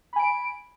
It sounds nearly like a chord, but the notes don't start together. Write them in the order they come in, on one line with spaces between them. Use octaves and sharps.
B5 G#5 D7